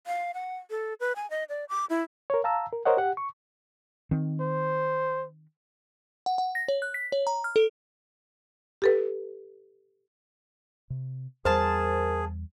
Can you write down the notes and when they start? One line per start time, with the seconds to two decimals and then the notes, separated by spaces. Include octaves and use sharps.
0.07 F5
0.34 F#5
0.70 A4
1.00 B4
1.16 G#5
1.30 D#5
1.49 D5
1.69 D6
1.90 E4
2.30 A#4 C#5
2.44 F5 A5 A#5 E6
2.73 A#4
2.85 A#4 C5 C#5 D#5 F#5
2.97 G4 F#5
3.17 C#6
4.11 D#3 C4
4.40 C5
6.26 F#5
6.38 F#5
6.55 A#6
6.68 C#5
6.82 F#6
6.94 B6
7.12 C#5
7.27 A#5
7.44 F6
7.56 A4
8.82 G4 A4 B4
10.90 C3
11.45 E2 G3 G#4 A#4 C5 F5 A5